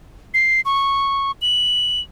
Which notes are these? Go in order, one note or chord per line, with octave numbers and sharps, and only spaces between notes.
C7
C#6
F#7